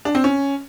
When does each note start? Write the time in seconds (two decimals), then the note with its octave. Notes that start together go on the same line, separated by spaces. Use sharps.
0.05 D4
0.15 C4
0.24 C#4